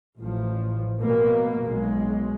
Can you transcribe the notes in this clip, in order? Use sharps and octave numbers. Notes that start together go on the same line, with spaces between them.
A1 F3
B2 A#3
B1 G#3